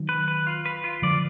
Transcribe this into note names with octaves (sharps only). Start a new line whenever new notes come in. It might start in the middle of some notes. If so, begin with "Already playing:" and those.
Already playing: D#3 F#3
B4
B4
F4
B4
F4
D3 F3 D5